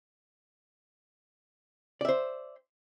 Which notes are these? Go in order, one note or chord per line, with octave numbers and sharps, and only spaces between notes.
C5 D5 E5